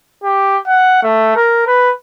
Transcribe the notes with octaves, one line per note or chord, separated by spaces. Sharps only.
G4
F#5
A3
A#4
B4